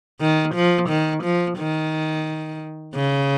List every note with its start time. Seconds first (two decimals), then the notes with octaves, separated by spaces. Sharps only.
0.21 D#3
0.55 F3
0.89 D#3
1.23 F3
1.58 D#3
2.95 C#3